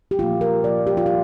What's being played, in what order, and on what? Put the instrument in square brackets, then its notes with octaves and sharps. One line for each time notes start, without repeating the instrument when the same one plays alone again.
[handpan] G4
A#2 F3 A#3 F4
A#4
C3 F3 A#3 D5
G4
F4
A#3 G4